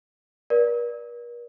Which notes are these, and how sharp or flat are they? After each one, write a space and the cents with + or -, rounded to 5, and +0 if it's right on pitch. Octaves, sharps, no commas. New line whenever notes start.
A#4 +45 D5 +0